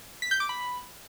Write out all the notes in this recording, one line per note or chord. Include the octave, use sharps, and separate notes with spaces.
B6
G6
D6
B5